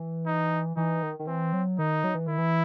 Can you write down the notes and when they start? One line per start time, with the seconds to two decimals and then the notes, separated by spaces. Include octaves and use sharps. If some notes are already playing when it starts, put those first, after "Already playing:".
Already playing: E3
0.26 D#4
0.77 E3 D#4
1.03 D#3
1.19 D#3
1.27 E3 C4
1.53 F#3
1.79 D#3 D#4
2.04 F#3
2.15 E3
2.27 D#3 E4
2.38 E3